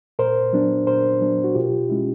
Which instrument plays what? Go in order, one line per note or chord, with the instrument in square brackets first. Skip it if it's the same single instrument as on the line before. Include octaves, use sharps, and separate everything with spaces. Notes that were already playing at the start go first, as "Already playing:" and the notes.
[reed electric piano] A#2 A#4 C5
F#3 B3 D4
A#2 A#4 C5
F#3 B3 D4
F#4
B2 F4 G4
G#3 C#4 E4